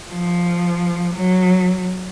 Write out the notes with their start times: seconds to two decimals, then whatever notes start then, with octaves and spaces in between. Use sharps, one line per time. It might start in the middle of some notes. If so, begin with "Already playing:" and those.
0.09 F3
1.15 F#3